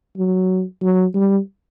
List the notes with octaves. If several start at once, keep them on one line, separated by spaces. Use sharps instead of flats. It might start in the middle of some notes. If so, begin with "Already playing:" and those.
F#3
F#3
G3